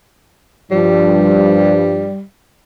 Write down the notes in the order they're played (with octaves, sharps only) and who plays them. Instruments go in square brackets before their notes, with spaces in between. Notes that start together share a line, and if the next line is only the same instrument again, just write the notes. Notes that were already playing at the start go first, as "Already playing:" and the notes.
[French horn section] G2 F3 [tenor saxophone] G3